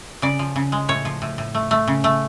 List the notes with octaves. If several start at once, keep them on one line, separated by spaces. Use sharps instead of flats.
C#3 D5
F3
C#3
G#3
A2 C#5
F3
A2
A2
A3
A3
C#3
A3